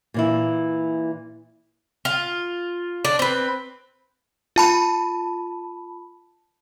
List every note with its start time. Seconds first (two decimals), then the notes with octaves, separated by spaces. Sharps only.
0.14 A#2 E3 E4
2.05 F4
3.05 D4
3.19 C4 B4
4.56 F4 A5 B5